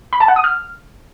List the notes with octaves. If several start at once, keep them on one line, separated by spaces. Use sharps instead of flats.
B5
A5
F#5
D#6
F6